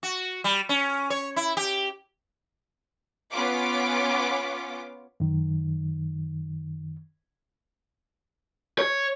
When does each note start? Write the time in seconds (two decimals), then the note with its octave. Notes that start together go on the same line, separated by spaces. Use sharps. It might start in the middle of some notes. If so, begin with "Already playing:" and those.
0.03 F#4
0.44 G3
0.69 C#4
1.10 C#5
1.36 E4
1.57 G4
3.31 B3 C#4 F4 D6
5.20 F#2 D#3
8.79 C#5